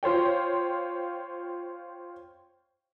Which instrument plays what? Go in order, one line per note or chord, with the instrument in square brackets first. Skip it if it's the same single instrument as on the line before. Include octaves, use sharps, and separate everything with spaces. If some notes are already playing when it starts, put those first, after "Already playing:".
[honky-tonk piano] F4 C5 C#5 G5